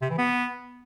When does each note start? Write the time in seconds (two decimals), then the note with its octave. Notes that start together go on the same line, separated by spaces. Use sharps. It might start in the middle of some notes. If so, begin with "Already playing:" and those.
0.02 C3
0.10 E3
0.18 B3